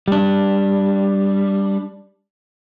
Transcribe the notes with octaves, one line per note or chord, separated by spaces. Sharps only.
G3 D4